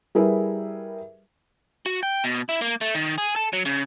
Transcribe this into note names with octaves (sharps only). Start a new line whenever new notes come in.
G3 E4 G#4 A#4 B4 E5
F#4
G5
B2
E4
A#3
A3
D#3
G#4
A4
F#3
C#3